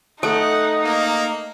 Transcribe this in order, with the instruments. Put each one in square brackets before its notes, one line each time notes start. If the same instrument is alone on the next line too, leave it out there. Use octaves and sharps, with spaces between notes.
[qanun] A3 [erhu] D#4 [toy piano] A4 [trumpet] F#5
[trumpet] A#3